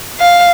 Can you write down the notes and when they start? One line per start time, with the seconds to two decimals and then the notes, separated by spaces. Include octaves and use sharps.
0.20 F5